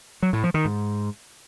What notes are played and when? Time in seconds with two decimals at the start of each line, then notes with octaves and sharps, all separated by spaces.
0.22 F#3
0.33 A2
0.44 F3
0.54 D#3
0.65 G#2